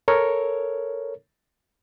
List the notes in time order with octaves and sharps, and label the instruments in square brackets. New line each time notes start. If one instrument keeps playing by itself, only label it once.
[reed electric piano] A4 A#4 C#5